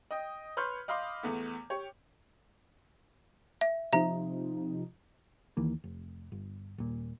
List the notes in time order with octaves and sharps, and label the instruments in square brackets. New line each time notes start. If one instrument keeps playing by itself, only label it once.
[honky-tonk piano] D#5 G5
B4 C#5 C6 F6 G6
D#5 F5 B5 C6 D6
E2 A3 B3
G4 C#5
[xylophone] E5
[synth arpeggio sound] C3 F3 D#4 [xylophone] E5 A#5
[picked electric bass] D#2 D#3 E3 A#3
F1
G1
D#1 A#2